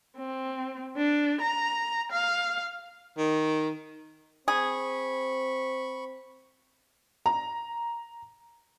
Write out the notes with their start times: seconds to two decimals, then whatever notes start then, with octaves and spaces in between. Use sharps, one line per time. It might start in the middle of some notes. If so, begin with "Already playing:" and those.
0.17 C4
0.97 D4
1.41 A#5
2.12 F5
3.18 D#3
4.48 C4 G#4 B5 C#6
7.26 A#5